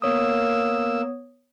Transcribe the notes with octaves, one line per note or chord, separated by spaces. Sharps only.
A#3 B3 C#5 D#6 E6